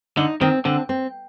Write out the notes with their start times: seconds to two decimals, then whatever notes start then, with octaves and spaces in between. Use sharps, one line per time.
0.17 D3 D#4
0.41 D#3 C4
0.65 D3 C4
0.89 C4